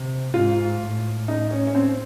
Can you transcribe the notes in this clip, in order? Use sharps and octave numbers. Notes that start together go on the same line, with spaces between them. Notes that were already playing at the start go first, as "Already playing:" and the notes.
Already playing: C3
G#2 F4
A2
D#4
C#4
C#4
C4